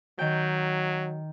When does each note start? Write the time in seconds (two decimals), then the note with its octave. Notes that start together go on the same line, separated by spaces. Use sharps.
0.19 D#3 F#3 G5